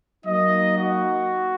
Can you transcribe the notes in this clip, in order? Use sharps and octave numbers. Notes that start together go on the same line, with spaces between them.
F#3 A#3 D#4 D#5
F#4